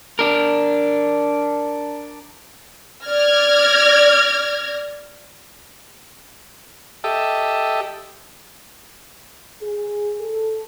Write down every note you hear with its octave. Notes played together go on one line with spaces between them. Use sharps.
D4 A#4
D5 F6 G#6 A#6
G4 A4 D#5 E5
G#4
A4